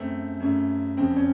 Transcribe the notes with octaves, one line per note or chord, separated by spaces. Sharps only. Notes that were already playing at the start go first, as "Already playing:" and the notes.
Already playing: F#2 C#3 A3 C4
F#2 C#3 A3
F#1 F2 C#3 C4
C#4